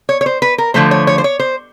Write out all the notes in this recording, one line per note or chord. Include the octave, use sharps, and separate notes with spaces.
C#5
C#5
C5
B4
A#4
D3 F3 A3 C5
C#5
C#5
C5
C#5
C5